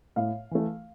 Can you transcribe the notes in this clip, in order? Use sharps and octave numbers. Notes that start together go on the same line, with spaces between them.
A2 F5
E3 A3